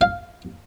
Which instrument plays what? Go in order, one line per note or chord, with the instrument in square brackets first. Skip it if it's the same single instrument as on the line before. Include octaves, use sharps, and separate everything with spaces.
[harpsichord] F5